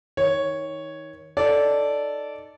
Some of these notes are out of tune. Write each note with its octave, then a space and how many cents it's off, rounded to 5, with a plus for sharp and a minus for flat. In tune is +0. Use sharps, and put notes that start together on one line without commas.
D#3 +25 C#5 +0
D#4 -10 A4 +0 D5 -15